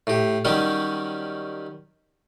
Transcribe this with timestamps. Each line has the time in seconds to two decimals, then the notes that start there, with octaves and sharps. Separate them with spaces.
0.07 A2 G4
0.45 D#3 F#3 G3 C#4 G4